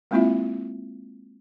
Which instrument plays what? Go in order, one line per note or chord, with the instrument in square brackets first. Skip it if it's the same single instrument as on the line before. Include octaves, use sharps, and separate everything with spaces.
[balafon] G#3 A#3 C4 E4 F4 E5